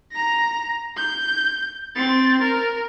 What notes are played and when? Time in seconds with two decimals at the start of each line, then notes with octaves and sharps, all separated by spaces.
0.12 A#5 A#6
0.97 G6
1.95 C4 A6
2.41 A#4